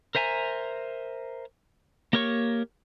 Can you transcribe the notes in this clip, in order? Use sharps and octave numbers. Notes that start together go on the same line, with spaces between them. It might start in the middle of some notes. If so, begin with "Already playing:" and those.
A#4 C5 E5 G#5 A#5
A#3 G4 A#4 C#5 C#6